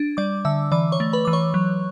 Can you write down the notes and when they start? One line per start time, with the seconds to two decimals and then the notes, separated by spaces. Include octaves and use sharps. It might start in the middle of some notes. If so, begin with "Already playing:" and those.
Already playing: D4
0.17 G3 D5 D6
0.45 D3 E5 E6
0.71 E3 D5 D6
0.92 C#5 C#6
1.00 A3
1.13 B4 B5
1.25 E3 D6
1.33 C#5 C#6
1.54 F#3